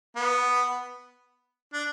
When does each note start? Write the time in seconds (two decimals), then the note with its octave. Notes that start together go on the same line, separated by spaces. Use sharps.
0.16 B3
1.73 D4